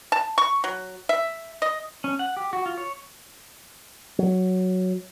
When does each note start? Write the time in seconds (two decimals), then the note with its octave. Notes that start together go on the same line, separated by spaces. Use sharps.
0.12 A5
0.38 C#6
0.64 F#3
1.09 E5
1.62 D#5
2.04 C#4
2.19 F#5
2.37 G4
2.53 F#4
2.66 F4
2.78 C#5
4.19 F#3